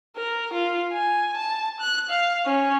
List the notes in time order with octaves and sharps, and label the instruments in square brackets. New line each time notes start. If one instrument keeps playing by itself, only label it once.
[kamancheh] A#4
F4
G#5
A5
F#6
F5
C#4